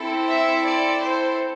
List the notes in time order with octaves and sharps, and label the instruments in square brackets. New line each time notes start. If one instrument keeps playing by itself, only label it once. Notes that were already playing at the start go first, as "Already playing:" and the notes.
Already playing: [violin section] C4 E4 A4
E5
D5
C5